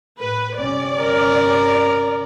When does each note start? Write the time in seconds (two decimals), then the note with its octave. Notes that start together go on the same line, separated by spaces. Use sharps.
0.20 A2 B4
0.58 G1 C3 C#4 D5
0.99 A#4